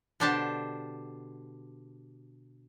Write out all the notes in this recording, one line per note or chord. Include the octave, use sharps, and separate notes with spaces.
B2 D3 D4 G4 C5 A5